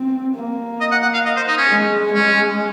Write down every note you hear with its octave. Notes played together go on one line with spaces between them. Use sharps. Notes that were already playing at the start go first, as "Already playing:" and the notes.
Already playing: C4
A#3
D#5
F#5
F#5
F5
D#5
C5
D#4
C#4
G#3
G#3 C#4